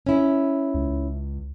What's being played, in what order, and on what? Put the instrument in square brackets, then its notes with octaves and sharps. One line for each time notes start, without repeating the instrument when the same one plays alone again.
[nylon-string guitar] C#4 E4
[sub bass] C#2